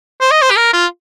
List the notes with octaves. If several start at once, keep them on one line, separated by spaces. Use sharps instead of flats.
C5
D#5
C5
G4
A#4
F4